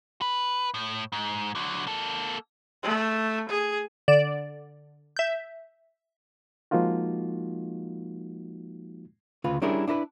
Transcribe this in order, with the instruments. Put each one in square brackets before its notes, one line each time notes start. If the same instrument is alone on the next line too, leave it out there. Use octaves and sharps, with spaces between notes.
[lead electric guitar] B4
A2
G#2
D3 F#3
A#3 A4
[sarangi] A3
G#4
[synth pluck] D3 D5 E7
E5 G6
[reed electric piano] F3 G#3 A#3 D#4 F4 F#4
[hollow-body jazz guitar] D2 C#3 F4 B4
G3 C#4 D4 E4 G#4 A#4
D4 E4 A#4 B4